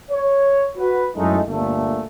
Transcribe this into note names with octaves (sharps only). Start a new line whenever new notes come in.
C#5
F#4 B4
F#2 A2 G#3 A3 D#4
G1 A#2 D3 A3